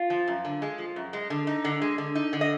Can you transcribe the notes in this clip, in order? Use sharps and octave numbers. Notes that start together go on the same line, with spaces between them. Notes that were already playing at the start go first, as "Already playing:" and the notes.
Already playing: F4
F3
F#2
D3
G#3
F3
F#2
G#3
D3
D#4
D3
G#3
D3
D#4
D3
D#5